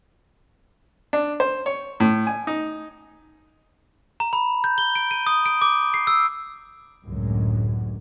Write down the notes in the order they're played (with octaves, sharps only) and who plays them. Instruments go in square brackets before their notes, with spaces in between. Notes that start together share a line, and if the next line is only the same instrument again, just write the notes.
[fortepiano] D4
C5
C#5
A2
G#5
D#4
[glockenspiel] A#5
B5
G6
G7
D7
D#7
D#6
D7
D6
C7
E6
[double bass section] C#2 F#2 A2 D3 F#3 G#3